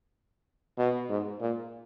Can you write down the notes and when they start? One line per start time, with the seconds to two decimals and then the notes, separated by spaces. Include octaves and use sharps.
0.78 B2
1.09 G#2
1.40 A#2